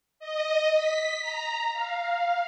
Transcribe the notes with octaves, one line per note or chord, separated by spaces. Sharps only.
D#5
B6
A#5
F5